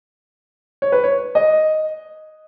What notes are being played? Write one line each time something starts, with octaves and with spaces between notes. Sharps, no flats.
C#5
B4
C#5
D#5